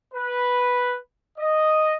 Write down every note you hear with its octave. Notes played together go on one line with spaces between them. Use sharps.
B4
D#5